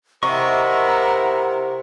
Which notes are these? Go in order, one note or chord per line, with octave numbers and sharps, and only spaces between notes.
C3 E4 A#4 D#5 F#5 A#5 C#6